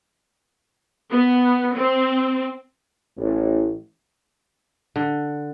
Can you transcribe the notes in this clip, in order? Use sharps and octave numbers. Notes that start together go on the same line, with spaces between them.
B3
C4
A1
D3